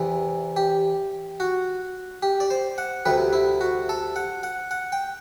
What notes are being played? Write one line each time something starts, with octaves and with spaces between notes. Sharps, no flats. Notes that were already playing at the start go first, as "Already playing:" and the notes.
Already playing: E2 C3 E3
G4
F#4
G4
D5
C5
F#5
D2 C3 G3 B4
E4
F#4
A4
F#5
F#5
F#5
G5